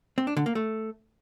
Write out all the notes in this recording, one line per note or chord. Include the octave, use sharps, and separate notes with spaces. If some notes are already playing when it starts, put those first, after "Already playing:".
C4
D4
D3
A#3
A3